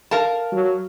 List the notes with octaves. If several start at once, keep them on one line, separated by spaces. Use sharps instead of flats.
A#4 F5 A5
F#3